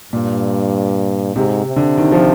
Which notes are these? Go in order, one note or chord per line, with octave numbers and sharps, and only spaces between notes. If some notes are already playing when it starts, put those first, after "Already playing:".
G2 A#2
G#2 C3
C3
D3
D#3
F3